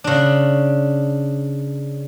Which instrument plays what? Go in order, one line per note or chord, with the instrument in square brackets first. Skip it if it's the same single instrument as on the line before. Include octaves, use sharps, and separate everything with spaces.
[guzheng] C#3 D4